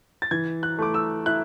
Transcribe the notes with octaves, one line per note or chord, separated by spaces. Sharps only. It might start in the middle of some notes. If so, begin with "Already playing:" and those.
A6
E3 G#6
F#6
A3 D6
E6
E4 F#6